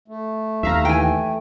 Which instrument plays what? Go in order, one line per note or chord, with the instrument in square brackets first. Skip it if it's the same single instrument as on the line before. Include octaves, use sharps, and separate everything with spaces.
[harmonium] A3
[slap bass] D#2 [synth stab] E5 F5 A#5
[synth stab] E3 [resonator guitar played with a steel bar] G5 G#5